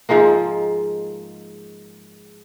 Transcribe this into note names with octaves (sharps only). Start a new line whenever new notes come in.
G#2 F3 G#3 A#3